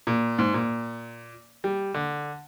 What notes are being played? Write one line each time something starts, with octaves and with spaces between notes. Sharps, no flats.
A#2
G#2
A#2
G3
D3